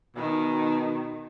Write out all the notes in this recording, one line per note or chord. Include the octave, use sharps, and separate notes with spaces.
B2 D#3